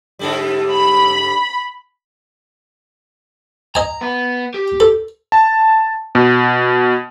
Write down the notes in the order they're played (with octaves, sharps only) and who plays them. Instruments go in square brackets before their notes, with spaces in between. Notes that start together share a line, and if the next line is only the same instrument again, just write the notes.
[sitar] G#2 D3 G3
[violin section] B5
[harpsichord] D#5 G#5 [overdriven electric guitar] A#5
[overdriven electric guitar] B3
G4
[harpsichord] A4
[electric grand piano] A5
B2